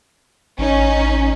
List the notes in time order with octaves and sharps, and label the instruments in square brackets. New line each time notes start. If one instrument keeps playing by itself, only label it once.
[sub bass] A1 [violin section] C#4 D#4